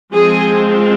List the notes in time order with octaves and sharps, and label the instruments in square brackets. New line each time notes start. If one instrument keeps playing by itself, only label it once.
[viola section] F3 G#3 C4 G#4